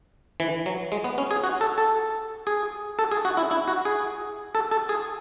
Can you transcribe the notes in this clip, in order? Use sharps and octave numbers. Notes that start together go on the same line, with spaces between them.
E3
F#3
G#3
B3
C#4
G#4
F#4
A4
A4
G#4
A4
G#4
F#4
E4
E4
F#4
G#4
A4
A4
G#4